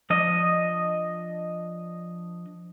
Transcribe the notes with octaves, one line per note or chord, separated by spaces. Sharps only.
F3 D4 D#5